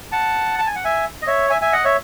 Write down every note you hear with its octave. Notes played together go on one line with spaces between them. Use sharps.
F#5 A5
A5
G#5
F#5
E5 G#5
D#5
C#5 E5
E5 G#5
E5 G#5
D#5 F#5
C#5 E5